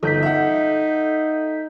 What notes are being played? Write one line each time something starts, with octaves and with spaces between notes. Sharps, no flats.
G1 D#4 A4 G6 B6
E5 F#5